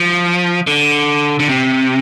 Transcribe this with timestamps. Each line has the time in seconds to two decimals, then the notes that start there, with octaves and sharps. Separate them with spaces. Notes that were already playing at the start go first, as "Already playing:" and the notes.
Already playing: F3
0.67 D3
1.40 D3
1.49 C3